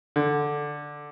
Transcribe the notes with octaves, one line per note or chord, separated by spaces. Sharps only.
D3